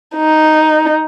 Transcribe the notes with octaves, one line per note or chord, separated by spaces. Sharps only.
D#4